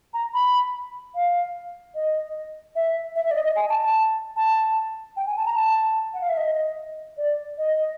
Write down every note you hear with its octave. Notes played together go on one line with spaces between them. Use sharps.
A#5
B5
F5
D#5
E5
E5
E5
D5
D#5
D#5
G#5
A5
A5
A5
G5
G#5
A5
A#5
A5
F#5
F5
E5
D#5
D5
D#5